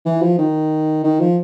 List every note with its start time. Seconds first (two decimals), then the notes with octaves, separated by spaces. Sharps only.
0.06 E3
0.22 F3
0.38 D#3
1.04 D#3
1.20 F3